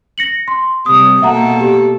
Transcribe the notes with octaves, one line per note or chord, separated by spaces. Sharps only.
A#6 C#7 F#7
C6
C3 G3 D#6
B2 A#3 A4 E5 F#5 A#5
G4